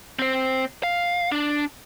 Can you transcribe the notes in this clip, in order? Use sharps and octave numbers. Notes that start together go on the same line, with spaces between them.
C4 C5
F5
D4